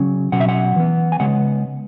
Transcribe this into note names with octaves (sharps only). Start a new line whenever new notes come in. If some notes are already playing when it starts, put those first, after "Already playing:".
Already playing: C#3 F#3 C#4
B2 F#3 C#4 F#5
E5
F#5
E3 B3
G#5
C#3 G#3 B3 F#5